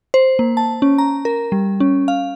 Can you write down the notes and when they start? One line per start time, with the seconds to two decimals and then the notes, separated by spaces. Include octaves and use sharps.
0.14 C5
0.39 A#3
0.57 A5
0.82 C#4
0.98 A#5
1.25 A#4
1.52 G3
1.80 C#4
2.08 F5